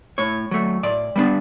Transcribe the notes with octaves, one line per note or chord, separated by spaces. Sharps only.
A2 C#5
F#3 A3
A2 D5
G3 B3 D4